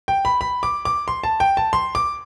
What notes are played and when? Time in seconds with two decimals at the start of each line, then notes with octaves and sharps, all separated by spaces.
0.08 G5
0.25 B5
0.41 B5
0.63 D6
0.85 D6
1.08 C6
1.24 A5
1.40 G5
1.57 A5
1.73 C6
1.95 D6